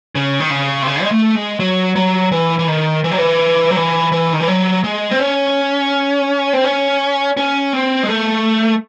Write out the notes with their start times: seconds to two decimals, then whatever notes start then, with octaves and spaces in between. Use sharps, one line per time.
0.15 C#3
0.40 D#3
0.50 C#3
0.83 C3
0.87 C#3
1.02 G#3
1.11 A3
1.35 G#3
1.60 F#3
1.96 F#3
2.32 E3
2.59 E3
2.67 D#3
3.04 E3
3.11 F#3
3.18 E3
3.71 F#3
3.76 E3
4.12 E3
4.33 D#3
4.40 E3
4.48 F#3
4.84 G#3
5.11 C4
5.20 C#4
6.53 C4
6.64 C#4
7.37 C#4
7.73 C4
8.03 G#3
8.09 A3